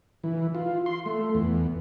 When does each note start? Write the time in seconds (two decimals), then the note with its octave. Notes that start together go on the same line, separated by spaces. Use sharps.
0.24 E3
0.55 F4
0.86 C6
1.06 A3
1.35 E2